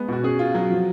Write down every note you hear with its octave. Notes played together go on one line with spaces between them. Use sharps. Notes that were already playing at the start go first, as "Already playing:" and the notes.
Already playing: G#3 B3
B2 F#4
C#4 G#4
F4
F#3
F3